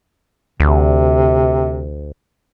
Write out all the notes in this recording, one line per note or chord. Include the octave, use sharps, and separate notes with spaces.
D2 C3